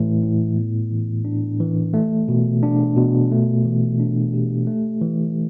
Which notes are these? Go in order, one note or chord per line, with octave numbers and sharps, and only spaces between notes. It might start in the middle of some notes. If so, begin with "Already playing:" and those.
Already playing: A2 E3 A3
A2
B3
E3
D4
E3
A3
B2
D4
B2
A3
E3
D4
G4
A3
E3